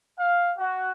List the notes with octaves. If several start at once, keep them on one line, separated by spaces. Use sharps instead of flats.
F5
F#4